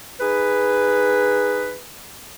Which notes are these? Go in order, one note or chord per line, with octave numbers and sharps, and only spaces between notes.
D#4 G#4 B4